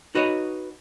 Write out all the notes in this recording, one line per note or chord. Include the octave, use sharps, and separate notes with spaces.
D#4 F#4 B4 C#5 D#5